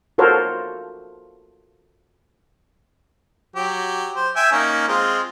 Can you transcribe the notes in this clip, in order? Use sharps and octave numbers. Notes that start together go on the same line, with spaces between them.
F4 F#4 A4 A#4 C5 C#5
F#3 G4
C5
E5 G5 G#5
A#3 C#4 D#4
G#3 C4 F4